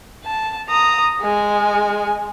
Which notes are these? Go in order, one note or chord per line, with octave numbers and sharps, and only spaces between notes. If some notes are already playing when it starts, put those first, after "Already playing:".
A5
A#5 D#6
G#3 G#5